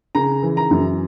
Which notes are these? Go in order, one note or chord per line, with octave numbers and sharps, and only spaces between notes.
C#3 A#5
E3
A#5
F#2